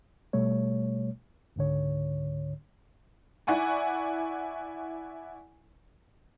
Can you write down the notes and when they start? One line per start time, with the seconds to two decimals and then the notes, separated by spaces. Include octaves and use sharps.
0.33 B2 G3 A3 C#5
1.56 C#2 G#2 D3 C#5
3.47 E4 D5 F#5 G#5 C#6